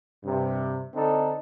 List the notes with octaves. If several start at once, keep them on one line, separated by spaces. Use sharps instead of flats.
G2 C3
D3 C4 D4 D#4 A4